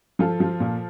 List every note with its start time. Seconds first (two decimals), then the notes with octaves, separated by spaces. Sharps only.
0.19 F3 F4 A4
0.40 F3
0.60 A#2